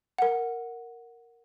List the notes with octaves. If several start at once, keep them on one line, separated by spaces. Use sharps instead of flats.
A#4 F#5